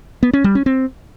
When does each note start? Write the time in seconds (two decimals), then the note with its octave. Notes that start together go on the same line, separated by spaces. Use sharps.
0.23 B3
0.33 C#4
0.44 G3
0.55 C#4
0.66 C4